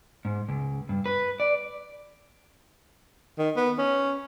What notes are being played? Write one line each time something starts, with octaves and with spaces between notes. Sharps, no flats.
G#2
C#2
G2
B4
D5
D#3
B3
C#4